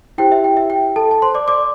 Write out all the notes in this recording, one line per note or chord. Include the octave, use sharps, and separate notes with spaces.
E4 G4 C5 G5
E5
G5
E5
G5
A4 A5
A5
C5 C6
D5 D6
D5 D6